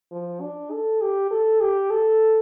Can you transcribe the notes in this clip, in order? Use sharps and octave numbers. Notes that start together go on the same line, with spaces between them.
F3
D4
A4
G4
A4
G4
A4